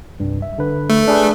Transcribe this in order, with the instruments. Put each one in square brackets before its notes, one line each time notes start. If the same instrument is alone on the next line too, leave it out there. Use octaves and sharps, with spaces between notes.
[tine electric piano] C2 G2
E5
D3 B4
[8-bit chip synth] A3
[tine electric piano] D4 G#4 B4